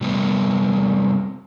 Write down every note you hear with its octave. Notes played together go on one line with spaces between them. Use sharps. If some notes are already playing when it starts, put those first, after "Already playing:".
C3 G3 A#3 B3